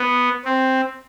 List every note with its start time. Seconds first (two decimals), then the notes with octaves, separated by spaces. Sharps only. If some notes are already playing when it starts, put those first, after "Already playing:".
Already playing: B3
0.45 C4